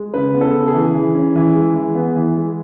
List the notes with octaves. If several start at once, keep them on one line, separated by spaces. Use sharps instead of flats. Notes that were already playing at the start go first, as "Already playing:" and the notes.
Already playing: G#3
C#3 B4
B3
A4
C#3
G#4
E3
E3
C#4
E3
G#3
E3
B3
E3
G#3